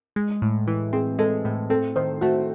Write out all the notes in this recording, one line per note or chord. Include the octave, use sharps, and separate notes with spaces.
G#3
A2
E3
C4 G#4
G#3 A4
A2
C4 A4
D#3 C5
A3 F#4